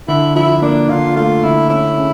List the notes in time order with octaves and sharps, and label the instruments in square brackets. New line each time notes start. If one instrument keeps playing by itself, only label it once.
[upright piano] D3 [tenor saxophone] E4
[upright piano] F3 [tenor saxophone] E4
[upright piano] A#3 [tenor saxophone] D4
[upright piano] D3 [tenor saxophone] F4
[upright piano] A3 [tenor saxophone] F4
[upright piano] D3 [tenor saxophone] E4
[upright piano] C#4 [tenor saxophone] E4
[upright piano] C#3